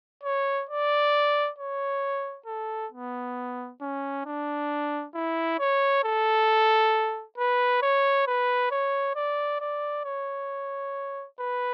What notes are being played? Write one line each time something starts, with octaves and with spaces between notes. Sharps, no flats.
C#5
D5
C#5
A4
B3
C#4
D4
E4
C#5
A4
B4
C#5
B4
C#5
D5
D5
C#5
B4